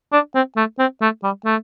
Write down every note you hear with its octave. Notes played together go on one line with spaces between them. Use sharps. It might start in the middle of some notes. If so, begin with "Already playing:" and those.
D4
C4
A3
C4
A3
G3
A3